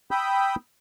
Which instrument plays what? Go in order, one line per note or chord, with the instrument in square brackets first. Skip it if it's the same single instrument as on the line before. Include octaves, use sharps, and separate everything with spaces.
[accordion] G5 B5 D#6 E6 G6